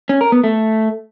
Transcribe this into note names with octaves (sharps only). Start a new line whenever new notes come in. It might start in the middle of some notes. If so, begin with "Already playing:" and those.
C#4
A#4
B3
A3